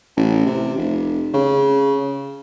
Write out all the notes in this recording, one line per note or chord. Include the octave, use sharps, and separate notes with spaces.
A1
C3
F1
C#3